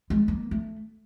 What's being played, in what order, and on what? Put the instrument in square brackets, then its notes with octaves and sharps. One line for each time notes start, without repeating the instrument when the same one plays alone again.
[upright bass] G#3
A#3
A3